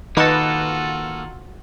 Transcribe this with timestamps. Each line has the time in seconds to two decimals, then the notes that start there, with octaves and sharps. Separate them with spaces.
0.17 D#3 A#3 F4 F#4 A4 B4 D#5 F#5